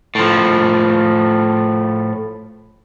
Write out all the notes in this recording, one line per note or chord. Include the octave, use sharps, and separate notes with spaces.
A2 F3